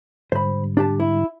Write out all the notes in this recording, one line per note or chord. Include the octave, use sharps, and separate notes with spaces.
G#2 D3 G3 C5 B5
D4 G4 A5
E4